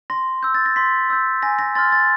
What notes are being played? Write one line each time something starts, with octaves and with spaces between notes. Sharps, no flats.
C6 A#6
E6 G6
A6
A#6
C6 B6
E6 G6
G#5 A#6
A#6
C6 F6 A6
A6